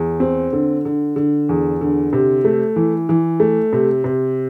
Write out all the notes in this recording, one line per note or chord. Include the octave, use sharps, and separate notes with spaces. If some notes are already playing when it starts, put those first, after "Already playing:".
Already playing: E2
C4
D3
D3
D3
E2
D3
C3
A3
E3
E3
A3
C3
C3